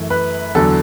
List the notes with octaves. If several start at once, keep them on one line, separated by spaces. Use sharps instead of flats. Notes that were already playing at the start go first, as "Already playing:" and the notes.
Already playing: F#2 E3 A3
B4
E2 D3 F#3 A4